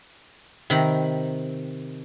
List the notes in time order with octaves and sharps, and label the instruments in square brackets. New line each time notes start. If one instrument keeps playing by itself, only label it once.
[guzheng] C3 D#3 A#5 B5